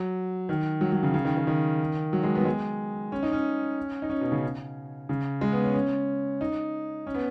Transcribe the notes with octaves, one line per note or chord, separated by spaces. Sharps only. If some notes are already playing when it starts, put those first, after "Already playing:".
Already playing: F#3
D#3
F#3
F#3
C#3
C#3
D#3
D#3
D#3
F#3
G#3
B3
F#3
G#3
C#4
D#4
C#4
D#4
C#4
B2
C#3
C#3
G#3
B3
C#4
C#4
D#4
C#4
B3